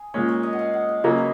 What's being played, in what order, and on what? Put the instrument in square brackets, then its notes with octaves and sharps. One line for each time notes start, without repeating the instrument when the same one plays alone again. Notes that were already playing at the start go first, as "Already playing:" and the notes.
Already playing: [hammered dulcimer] G#4
[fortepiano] A#2 G#3 C#4 [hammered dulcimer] A#4
[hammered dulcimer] C#5
D#5
F#5
F5
F#5
F5
[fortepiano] C#3 F#3 A#3 C#4 [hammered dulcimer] D#5
[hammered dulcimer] B4